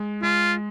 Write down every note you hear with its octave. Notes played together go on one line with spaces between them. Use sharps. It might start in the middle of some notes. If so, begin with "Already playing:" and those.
Already playing: G#3
G#3 F4